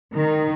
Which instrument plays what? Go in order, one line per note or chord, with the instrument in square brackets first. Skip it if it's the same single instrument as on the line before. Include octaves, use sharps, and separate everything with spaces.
[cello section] D#3